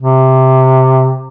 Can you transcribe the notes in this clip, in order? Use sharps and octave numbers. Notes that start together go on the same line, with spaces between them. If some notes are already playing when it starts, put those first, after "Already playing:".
C3